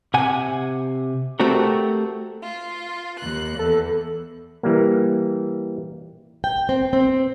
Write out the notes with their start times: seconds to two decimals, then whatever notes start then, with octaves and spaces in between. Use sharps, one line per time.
0.14 C3 F#5 G#5
1.40 A3 C4 F#4 G4 A#4
2.43 F4
3.20 D#2 F#6
3.59 E2 A4
4.63 E3 G3 A#3
6.44 G5
6.69 C4
6.93 C4